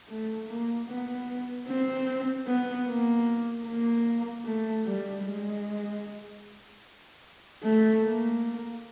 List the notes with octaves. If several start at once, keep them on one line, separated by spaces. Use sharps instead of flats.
A3
A#3
B3
C4
B3
A#3
A#3
A3
G3
G#3
A3
A#3